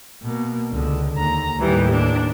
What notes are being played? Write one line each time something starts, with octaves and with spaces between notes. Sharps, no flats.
B2 A#3
C#2 D3
D#2 A#5
D#2 A2 E3 G3
D4